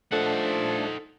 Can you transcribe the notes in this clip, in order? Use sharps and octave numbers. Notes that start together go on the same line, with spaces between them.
F3 A3 D4 D#4 A4 F#5